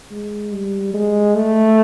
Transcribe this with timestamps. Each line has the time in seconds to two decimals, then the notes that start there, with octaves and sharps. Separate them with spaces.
0.11 G#3
0.52 G3
0.94 G#3
1.35 A3